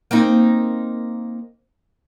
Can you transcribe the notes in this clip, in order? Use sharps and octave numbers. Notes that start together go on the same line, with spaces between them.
A#3 C4 D#4